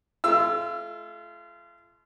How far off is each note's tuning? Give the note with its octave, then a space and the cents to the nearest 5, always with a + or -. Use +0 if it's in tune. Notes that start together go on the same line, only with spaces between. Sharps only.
A3 -40 F4 -35 E6 +15